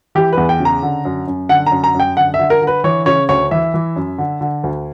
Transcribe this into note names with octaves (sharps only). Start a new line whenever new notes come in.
E3 G4
E2 B4
G5
C#3
A#5
D3
F#2
F#2
D3 F#5
A#5
F#2
A#5
F#2
G5
D3 F#5
E5
D3
A#4
D3
B4
E3 C#5
C#3 C#5
D2 C#5
E3 E5
E3
F#2
D3
D3
D2